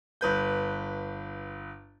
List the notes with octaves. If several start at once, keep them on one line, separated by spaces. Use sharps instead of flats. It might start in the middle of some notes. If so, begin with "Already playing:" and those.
G1 B4 G6